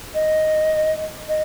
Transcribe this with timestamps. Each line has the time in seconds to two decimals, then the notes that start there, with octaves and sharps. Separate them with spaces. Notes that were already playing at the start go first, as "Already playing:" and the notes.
0.15 D#5
1.29 D#5